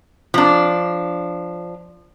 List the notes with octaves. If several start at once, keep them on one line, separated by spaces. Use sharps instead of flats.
F3 D4